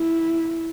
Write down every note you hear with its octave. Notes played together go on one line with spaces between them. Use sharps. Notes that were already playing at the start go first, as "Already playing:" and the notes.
Already playing: E4